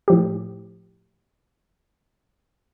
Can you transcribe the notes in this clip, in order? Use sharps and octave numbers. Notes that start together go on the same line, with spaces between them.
A2 F3 G4